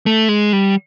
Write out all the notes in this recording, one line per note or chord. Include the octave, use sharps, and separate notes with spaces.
A3
G#3
G3